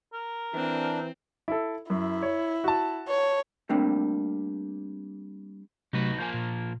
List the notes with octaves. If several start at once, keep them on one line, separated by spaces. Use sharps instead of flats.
A#4
E3 C4 D4
E4 A4
F#2 E4
C#5
F#4 A5
C#5
G3 A3 A#3 C4 D4
C3 F#3 A3 D#4 F#4 B4
F3 A#3 A#4 G#5 G6
A#2